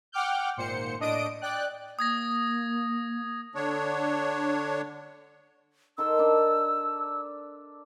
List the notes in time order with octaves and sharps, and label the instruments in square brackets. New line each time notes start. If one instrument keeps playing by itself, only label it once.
[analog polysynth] F#5 G5 D6 F6 G6
G#1 A#2 C5 C#7
A2 D4 D#5 D#6 D7
D5 G5 F#6
[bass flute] A#3 [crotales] D#6 G#6 A#6
[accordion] D3 D4 C#5
[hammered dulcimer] D#3 A4 C6 [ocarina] E6
[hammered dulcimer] D4